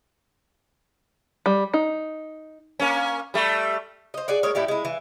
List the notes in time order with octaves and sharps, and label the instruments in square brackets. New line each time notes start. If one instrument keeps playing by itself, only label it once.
[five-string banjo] G3
D#4
[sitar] A#3 C#4
G3 A3
[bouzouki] C5 D#5
G#4 C#5 D5 F#5
G#3 A#3 C#5
A2 E4 G4 D5
G#3 E4
E3